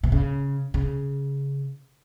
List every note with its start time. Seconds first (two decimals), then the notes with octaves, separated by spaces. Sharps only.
0.03 B2
0.12 C#3
0.74 C#3